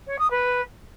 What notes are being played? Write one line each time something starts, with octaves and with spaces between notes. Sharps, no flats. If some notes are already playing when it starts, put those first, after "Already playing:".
C#5
D#6
B4